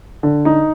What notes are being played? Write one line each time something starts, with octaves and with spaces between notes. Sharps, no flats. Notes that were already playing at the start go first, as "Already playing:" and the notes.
D3
D#4